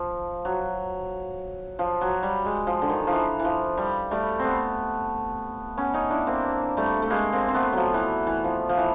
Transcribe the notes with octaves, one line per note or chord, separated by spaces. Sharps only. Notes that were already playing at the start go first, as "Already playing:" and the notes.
Already playing: F3
F#3
F3
F#3
G3
G#3
F3
D3
D#3
E3 F3
E3
F3
G3
G3 A3
A3 B3 C4
B3 C#4
C#4 D#4
D4 E4
A#3 C4
G3 A3
A3
G#3 A#3
A#3 C4
C4
A3 B3
F3 F#3
E3
E3
F3
F3
E3